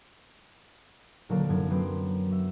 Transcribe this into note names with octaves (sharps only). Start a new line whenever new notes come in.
D#1 D3 F#3 A#3 A6 D7
F1 F#2 F#3 D4 G#6
F#3 B3 C4 B4 C6 D7
F#3 E5